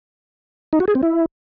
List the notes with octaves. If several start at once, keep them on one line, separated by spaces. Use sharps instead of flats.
D#4
F#4
G#4
C4
E4